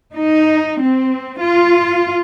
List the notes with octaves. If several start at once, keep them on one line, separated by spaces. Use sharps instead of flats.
D#4
C4
F4